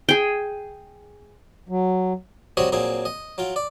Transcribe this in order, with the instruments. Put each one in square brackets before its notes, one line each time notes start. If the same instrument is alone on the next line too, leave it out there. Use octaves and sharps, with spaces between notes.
[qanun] G#4 G5
[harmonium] F#3
[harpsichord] C3 G3 C4 F#4 C#5 D#5
A#2 F#3 C4 G#4
D#5
F#3 F4 G5
D5